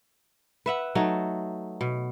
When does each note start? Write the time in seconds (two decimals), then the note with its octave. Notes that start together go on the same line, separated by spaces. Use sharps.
0.66 B4 E5 F#5
0.95 F#3 A3 D#4
1.81 B2